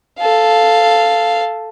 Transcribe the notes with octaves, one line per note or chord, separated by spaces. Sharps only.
A4 F5